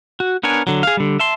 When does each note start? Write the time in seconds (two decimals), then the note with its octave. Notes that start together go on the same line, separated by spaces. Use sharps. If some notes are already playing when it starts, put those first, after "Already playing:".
0.20 F#4
0.43 B3 D4 A#4 C#5 G#5
0.67 D3 F#3
0.83 G#4 F5
0.97 D3 G3
1.19 E5 A5 C6